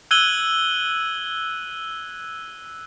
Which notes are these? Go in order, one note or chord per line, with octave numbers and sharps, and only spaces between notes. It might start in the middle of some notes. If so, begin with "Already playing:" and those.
E6 F#6 G#6 D#7 F#7 G7